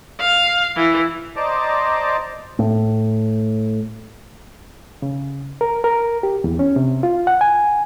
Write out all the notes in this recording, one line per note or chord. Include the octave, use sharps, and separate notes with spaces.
F5
E3
C5 D5 D#5 A5 A#5 D6
A2
C#3
A#4
A#4
G4
E2
C#4
C3
F4
F#5
G#5